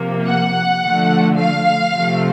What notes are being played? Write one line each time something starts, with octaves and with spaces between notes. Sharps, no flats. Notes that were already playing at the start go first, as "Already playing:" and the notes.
Already playing: C3 F3 A#3
F#5
D3 F3 A3
F5
C3 F3 A3